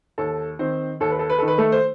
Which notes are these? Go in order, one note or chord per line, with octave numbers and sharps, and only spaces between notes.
D#2 A4 A5
D#3 C4 C5
D#2 A4
B4
A4
B4
D#3 A4
B4
A3 A4
C5